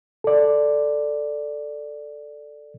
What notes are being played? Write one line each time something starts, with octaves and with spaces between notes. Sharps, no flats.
A4 D5